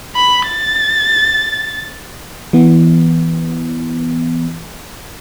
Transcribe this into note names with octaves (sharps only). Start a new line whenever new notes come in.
B5
A6
E3 B3